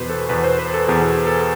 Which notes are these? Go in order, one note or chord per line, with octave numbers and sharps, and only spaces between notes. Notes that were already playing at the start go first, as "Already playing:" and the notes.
Already playing: E2 B2 B4 C5
A4
E2 B2 B4
C5
B4
A4
E2 B2 G#4
A4